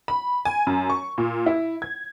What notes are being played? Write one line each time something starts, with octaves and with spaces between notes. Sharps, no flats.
B5
G#5
F#2
C#6
A#2
E4
G#6